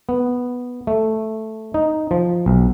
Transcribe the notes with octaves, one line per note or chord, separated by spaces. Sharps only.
B3
A3
D#4
F3
B1